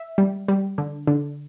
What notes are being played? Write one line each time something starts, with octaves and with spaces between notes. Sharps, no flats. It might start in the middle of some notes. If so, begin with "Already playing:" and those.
Already playing: E5
G3
G3
D3
D3